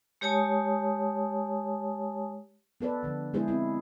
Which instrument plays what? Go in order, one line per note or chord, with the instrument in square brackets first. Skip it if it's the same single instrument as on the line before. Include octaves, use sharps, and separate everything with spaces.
[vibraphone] G#3 G4 C#5 G#5 A5 D#6
[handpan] B3 A4 B4 D5
D3 F3
G#3 B3 E4 G#4 C5
C4 E4